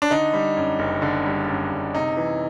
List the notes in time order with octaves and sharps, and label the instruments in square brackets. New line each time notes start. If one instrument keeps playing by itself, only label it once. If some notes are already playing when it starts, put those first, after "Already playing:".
[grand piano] D4
D3 D#4
G3
F#2
F#1
D3
G3
F#2
F#1
C3 D#4
E3